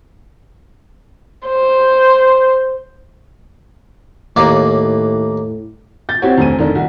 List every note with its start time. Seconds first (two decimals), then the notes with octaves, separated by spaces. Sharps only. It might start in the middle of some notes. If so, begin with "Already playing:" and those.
1.48 C5
4.36 D#2 A2 A#3 D5
6.09 G6 A6
6.22 C4 E4 F#4 G4 C#5
6.38 F1 D2 C4 G#5 D#7
6.59 F1 D3 D#3 D4
6.75 C2 F#4